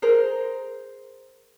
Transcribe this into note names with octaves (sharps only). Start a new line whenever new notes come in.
G#4 A#4 C5 A#5